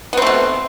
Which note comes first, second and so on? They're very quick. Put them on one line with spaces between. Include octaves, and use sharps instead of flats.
B3 C4 A3 B2